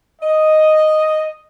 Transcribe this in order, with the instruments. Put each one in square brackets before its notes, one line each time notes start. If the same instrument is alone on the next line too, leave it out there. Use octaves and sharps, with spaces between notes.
[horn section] D#5